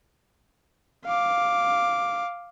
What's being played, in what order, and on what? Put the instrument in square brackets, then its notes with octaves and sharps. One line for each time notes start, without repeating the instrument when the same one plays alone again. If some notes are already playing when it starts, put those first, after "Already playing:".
[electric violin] F5 D6